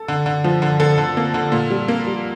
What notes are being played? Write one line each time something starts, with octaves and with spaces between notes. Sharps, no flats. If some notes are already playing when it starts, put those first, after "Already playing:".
Already playing: A4
D3
D3
F3
D3
D3 A4
D3
A#3
D3
A#2
G3
A#3
G3